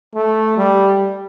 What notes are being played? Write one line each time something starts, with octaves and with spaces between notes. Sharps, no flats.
A3
G3